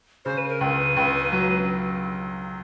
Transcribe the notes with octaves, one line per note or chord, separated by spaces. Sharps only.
C#3 C5
B4
A#4
C#2 B4
C#2
F#3